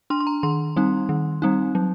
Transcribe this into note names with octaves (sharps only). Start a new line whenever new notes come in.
D4 C6
C6
A#5
D#3 C6
G3 C4 D#4
D#3
G3 C4 D#4
F#3